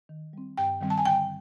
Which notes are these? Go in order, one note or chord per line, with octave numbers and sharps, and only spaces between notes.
D#3
G3 C4
G2 G5
D#3 G3 C4
A5
G#5
D3 G5